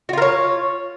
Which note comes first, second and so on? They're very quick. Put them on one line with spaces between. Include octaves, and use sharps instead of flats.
F#4 F4 A#4 C#5